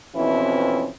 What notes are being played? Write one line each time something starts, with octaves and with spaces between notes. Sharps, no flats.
F2 B2 E3 C4 C#4 E4